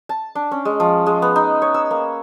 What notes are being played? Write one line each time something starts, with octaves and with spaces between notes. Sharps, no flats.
A5
D4
C#4
G#3
F3
G#3
B3
D#4
C#5
E6
A#3